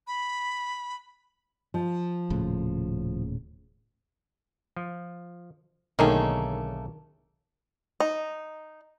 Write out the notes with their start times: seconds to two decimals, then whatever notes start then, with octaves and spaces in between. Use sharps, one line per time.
0.07 B5
1.74 F3
2.30 D#1 A2 C#3
4.76 F3
5.99 B1 D3 D#3 A3 A#3 C#4 G#4
8.00 D#4